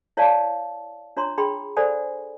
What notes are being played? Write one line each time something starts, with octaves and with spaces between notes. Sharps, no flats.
E4 C#5 D5 F5 A5
D4 F4 C#5 A#5 C6
D4 G#4 G5 B5 C6
A4 C5 D5 F#5 G#5